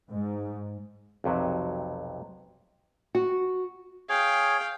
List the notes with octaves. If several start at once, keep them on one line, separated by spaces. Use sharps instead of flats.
G#2
B1 F2 C3 F#3
F#4
G#4 C#5 F5 G5